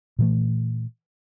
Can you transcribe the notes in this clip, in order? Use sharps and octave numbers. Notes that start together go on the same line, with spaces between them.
A#2 E3 A3